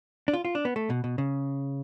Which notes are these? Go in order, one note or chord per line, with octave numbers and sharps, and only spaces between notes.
D4
F4
F4
D4
B3
A3
B2
B2
C#3